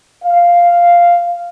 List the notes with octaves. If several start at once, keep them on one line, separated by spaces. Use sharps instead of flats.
F5